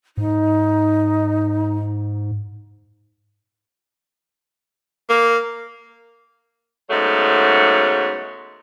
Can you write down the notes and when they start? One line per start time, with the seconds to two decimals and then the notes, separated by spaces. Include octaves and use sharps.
0.17 G#2 D#4
5.09 A#3
6.90 G#2 C#3 F#3 A3 B3